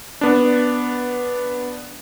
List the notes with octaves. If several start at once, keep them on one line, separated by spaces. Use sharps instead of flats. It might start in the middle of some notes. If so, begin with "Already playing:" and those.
B3 D4